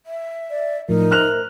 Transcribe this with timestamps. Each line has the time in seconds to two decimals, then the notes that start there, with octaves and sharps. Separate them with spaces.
0.06 E5
0.51 D5
0.89 A2 F3 D#4 A#4
1.11 C5 E5 A#5 F6 F#6 F7